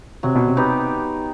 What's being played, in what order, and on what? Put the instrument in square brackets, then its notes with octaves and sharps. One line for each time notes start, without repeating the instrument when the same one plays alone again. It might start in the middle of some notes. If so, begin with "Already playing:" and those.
[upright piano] C3 [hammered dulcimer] F#3
[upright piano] B2
C3
[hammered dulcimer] B3 D#4 G4